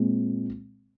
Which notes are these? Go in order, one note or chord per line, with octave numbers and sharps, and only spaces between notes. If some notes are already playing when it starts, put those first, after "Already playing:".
Already playing: A#2 G#3 C4